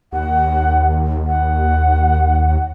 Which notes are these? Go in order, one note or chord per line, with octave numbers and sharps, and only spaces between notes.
D#2 F#5
F#5